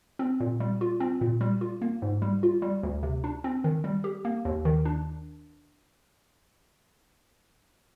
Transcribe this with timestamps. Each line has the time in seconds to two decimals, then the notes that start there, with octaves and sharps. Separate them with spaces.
0.19 C4
0.40 A#2
0.60 G3
0.81 F4
1.00 C4
1.21 A#2
1.41 G3
1.61 F4
1.82 A#3
2.02 G#2
2.22 G3
2.43 F4
2.62 G3
2.83 D2
3.03 C3
3.24 D4
3.44 C4
3.64 D#3
3.84 G3
4.04 G4
4.25 A#3
4.45 D#2
4.65 D#3
4.85 D4